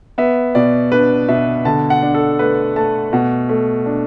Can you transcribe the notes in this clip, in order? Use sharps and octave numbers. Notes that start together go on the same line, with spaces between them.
B3 E5
B2 D5
D4 B4
B2 E5
D3 A5
F#5
D4
A4
A3 B4
A3 A5
B2 F#5
A3
D4